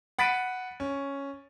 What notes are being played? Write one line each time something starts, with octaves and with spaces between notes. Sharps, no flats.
F#5 B5 A6 B6 D7 D#7
C#4